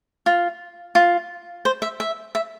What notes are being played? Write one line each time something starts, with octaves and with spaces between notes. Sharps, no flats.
F4
F4
C5
E5
E5
E5